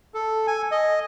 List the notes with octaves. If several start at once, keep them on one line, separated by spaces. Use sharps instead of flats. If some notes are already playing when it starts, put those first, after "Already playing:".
A4
G#5
D#5